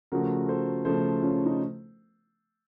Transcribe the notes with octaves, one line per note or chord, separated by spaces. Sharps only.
C#3 F3 A3 F#4 A#4
A4 C5
C#3 F3 A3 A4 C5
C#4 F4
D#4